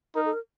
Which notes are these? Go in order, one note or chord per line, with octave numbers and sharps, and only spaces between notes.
D#4 A#4
A4
A#4